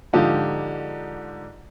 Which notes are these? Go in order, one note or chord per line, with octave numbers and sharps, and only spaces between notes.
G#2 D3 F3 D#4 F4 G4